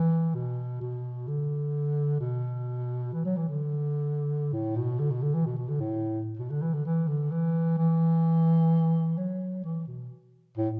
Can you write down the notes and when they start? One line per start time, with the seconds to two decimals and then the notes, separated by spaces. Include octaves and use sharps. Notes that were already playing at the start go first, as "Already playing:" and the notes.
Already playing: E3
0.34 B2
0.81 B2
1.28 D3
2.20 B2
3.13 E3
3.25 F#3
3.36 E3
3.48 D3
4.53 A2
4.76 B2
4.99 D3
5.11 B2
5.22 D3
5.34 E3
5.46 B2
5.57 B2
5.69 D3
5.80 A2
6.39 B2
6.50 D3
6.62 E3
6.73 D3
6.86 E3
7.08 D3
7.31 E3
7.78 E3
9.17 F#3
9.64 E3
9.87 B2
10.57 A2